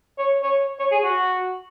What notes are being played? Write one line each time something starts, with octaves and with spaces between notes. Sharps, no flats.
C#5
C#5
C#5
G#4
F#4